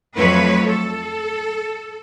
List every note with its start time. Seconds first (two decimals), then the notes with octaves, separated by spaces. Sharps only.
0.17 F2 F3 F#3 A3 B4 C#5
0.67 A4